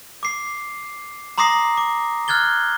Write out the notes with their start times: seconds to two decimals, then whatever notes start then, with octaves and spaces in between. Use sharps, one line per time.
0.23 D6 C7
1.38 A#5 C6 D6 D#6 A#6 C7
1.77 D6
2.28 F6 F#6 G#6 A6 G7